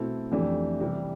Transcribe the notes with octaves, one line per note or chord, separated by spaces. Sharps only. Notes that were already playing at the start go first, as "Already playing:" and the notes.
Already playing: B2 A3 C4 E4 A4
F2 E3 A3 D4 G4
C3 E3 G3